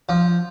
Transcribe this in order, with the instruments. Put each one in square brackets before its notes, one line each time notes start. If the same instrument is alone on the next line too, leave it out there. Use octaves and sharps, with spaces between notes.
[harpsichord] F3